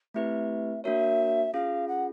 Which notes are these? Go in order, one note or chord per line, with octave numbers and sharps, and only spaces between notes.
A3 C4 E4 G4 B4 E5
A#3 D4 F#4 A#4 C#5 E5
C#4 F4 G#4 F5
F#5